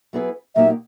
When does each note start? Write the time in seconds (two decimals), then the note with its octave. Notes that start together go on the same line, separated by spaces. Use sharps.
0.13 F#3 B3 E4 G#4 B4
0.55 A#2 F#3 A#3 D#4 G4 E5